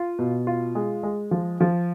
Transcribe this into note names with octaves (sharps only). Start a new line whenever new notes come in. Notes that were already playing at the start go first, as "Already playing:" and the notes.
Already playing: F4
B2
F4
G#3
G#3
F3
F3